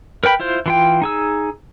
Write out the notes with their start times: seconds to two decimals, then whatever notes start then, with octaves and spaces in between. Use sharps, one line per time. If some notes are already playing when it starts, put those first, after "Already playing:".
0.24 A#4 B4 G5 B5
0.40 E4 F4 C5
0.66 E3 F4 G5
1.02 D#4 G#4 E6